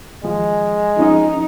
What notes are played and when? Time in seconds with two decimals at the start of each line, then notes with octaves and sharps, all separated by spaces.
0.23 D#2 F3 G#3
0.98 F3 C#4 D#4 D#5